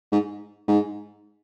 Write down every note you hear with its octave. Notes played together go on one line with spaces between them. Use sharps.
G#2
G#2